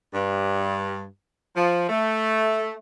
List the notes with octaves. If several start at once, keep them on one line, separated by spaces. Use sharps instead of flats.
G2
F3
A3